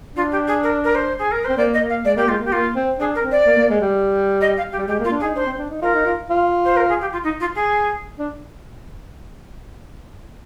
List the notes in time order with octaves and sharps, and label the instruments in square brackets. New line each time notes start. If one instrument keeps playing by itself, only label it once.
[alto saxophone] D4 [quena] F4
[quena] G4
G#4
A#4
A#4
C5
G#4
A#4
[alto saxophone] C4 [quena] C5
[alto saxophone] A#3 [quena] D5
[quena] D#5
[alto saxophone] A#3
[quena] F5
[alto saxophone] G#3 [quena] D5
[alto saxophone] A#3 [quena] G4
[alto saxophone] G#3 [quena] F4
[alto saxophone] A#3
[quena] G4
[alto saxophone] A#3 [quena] F4
[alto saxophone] C4
[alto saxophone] D4 [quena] G#4
[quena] A#4
[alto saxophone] C4
[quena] D5
[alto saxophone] A#3
A#3
G#3
G3
[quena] D#5
F5
G4
[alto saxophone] G3
[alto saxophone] G#3 [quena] G4
[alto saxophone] A#3
[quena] F4
[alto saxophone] D4
[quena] G#4
[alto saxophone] D#4
[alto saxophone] D4 [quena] C5
[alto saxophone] C4
D4
D#4
[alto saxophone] F4 [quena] A#4
[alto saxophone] D#4
F4
F4
[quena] C5
A#4
G#4
G4
F4
D#4
F4
G#4
[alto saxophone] D4